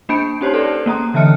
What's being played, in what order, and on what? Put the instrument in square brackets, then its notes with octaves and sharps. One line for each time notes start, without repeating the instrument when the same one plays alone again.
[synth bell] A#3 D4 B5 G6 C#7 D7
C#4 D#4 G4 C5 C#5 A5
A4 B4 D5
A#3 C#4 A#5 D#6
D3 E3 E5 A5 F6 C#7